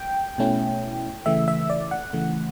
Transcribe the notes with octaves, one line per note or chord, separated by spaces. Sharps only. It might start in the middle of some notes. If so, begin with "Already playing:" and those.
Already playing: G5
B2 A3 C#4 E4
C#3 E3 A3 E5
E5
D5
F#5
C#3 E3 A3